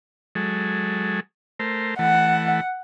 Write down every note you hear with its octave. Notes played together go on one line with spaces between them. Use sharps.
F#3 G#3 A4
A3 A#4 C5
E3 A3 F#5